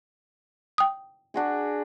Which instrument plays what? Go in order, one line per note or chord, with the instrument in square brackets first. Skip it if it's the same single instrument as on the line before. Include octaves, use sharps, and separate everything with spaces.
[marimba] G5 D#6
[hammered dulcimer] D4 F#4 G#4